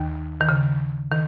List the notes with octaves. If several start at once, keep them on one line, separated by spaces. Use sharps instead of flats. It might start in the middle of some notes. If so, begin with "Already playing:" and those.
Already playing: D#2 D#3
D#3
C#3
D#3